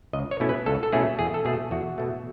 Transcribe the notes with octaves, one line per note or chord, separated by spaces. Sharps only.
C#2 D#5
C#5
B2 A3 C#4 E4
B4
C#2 A4
A4
B2 A3 C#4 E4 G#4
E2 G#4
A4
B2 A3 G#4
E2 F#4
B2 A3